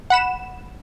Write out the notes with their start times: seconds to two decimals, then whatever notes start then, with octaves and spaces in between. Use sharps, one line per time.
0.10 F#5 B5 E7